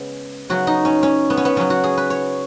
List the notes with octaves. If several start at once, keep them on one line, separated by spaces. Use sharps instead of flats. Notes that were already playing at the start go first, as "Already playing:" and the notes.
Already playing: C#3 G#3 B3
C#3 F#3 B3 F#4
D#4
C#4
C#4
B3
C#4
B3
C#3 F#3 B3 C#4
F#4
G#4
B4
C#5